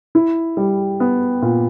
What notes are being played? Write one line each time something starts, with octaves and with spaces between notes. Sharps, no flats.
E4
G3
B3
A#2